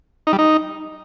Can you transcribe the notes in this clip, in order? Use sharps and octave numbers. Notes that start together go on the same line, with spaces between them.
D#4
G3
D#4